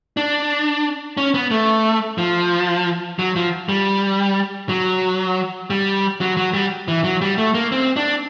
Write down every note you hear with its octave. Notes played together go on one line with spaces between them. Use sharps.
D4
C#4
B3
A3
F3
F#3
F3
G3
F#3
G3
F#3
F#3
G3
E3
F#3
G3
A3
A#3
C4
D4